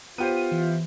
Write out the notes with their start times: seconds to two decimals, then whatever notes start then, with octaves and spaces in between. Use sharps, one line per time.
0.18 B3 F4 G4 C5 D#7
0.52 E3